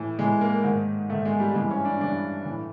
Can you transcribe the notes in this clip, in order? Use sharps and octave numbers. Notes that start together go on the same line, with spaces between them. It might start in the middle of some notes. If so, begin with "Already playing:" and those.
Already playing: A2 E3
A2 E3 G#3
A#3
G#2 D#3
G#2 D#3 A3
G#3
G3
G2 E3 G#3
C#4
D4
G2 E3 D4
A2 E3